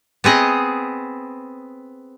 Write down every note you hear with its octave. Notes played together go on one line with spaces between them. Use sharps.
B3 C4 G#4 D#5